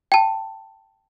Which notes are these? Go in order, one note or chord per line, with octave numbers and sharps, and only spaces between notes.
G5 A5